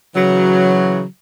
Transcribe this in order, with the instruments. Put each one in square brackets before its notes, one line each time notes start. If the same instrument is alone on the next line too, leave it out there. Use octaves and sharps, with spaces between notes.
[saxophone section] C#3 E3 F#3